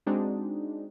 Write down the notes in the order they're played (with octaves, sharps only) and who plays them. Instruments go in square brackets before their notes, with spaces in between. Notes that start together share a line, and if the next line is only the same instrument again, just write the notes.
[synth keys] G#3 C4 D4 D#4 F#4